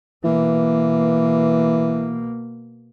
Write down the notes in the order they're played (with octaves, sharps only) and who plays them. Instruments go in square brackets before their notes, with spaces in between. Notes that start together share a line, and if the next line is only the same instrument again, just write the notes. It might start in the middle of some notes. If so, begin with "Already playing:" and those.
[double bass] B2 A#3 [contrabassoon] E3